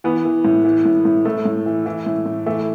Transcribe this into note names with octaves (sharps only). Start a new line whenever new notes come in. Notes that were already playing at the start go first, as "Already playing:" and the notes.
E3 B3
E3
A2
E3
A2
A2
A2 A3
A2
E3
E3
A2
A2
E3 A3